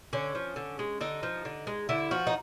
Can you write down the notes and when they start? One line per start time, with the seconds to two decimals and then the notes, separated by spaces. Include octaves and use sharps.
0.13 D3 C#4
0.35 F3
0.56 D3
0.79 G#3
1.01 D3 D#4
1.23 F3
1.45 D3
1.67 G#3
1.89 D3 E4
2.11 F3 F#4
2.27 D#4